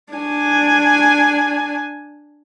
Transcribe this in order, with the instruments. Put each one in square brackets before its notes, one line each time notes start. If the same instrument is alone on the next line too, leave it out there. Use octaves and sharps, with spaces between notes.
[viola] D4 G#5